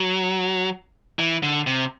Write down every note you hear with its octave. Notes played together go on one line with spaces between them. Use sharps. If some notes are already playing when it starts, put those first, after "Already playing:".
Already playing: F#3
E3
D3
C3